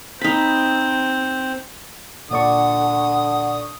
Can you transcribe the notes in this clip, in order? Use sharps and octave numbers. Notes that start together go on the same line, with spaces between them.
C4 D#4 B5
A#2 D3 D5 F#5 C#6 D#6